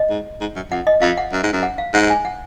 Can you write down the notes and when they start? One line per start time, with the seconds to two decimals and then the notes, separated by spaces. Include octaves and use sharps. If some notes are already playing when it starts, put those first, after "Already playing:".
Already playing: D#5
0.10 G#2
0.41 G#2
0.56 F#2
0.71 F2 F#5
0.87 D#5
1.01 F2 F5
1.18 F#5
1.33 F#2
1.43 G#2
1.53 F#2
1.63 F#5
1.78 F5
1.94 G#2 F#5
2.10 G#5
2.25 F#5